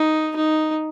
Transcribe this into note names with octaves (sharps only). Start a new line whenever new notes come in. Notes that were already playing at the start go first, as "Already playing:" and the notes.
Already playing: D#4
D#4